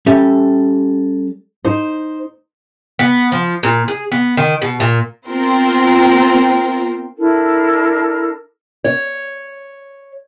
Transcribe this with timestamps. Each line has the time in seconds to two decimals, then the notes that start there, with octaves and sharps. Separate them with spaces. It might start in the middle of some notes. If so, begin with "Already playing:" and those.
0.06 G3 C#4 G4 A4 E5
1.65 D#4 C5
2.99 B3
3.32 F3
3.63 A#2
3.88 G#4
4.12 B3
4.37 D#3
4.62 B2
4.80 A#2
5.27 B3 C4 F4 A#4 C5 G5
7.18 D4 E4 A4 A#4
8.84 C#5